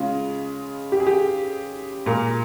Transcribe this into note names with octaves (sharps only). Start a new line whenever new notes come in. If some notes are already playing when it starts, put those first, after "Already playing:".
Already playing: C#3 G#3 F4
G4
G#4
G4
A#2 G#3 A#4